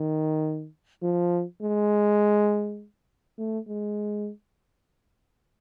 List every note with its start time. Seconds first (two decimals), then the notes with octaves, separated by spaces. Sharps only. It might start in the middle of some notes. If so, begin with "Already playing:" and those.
Already playing: D#3
1.02 F3
1.62 G#3
3.38 A3
3.68 G#3